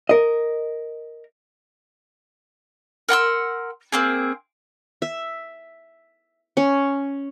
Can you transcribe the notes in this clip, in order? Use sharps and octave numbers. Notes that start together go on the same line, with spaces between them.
A#4 D#5
A#4 F#5 C6 E6
A#3 C4 G#4
E5
C#4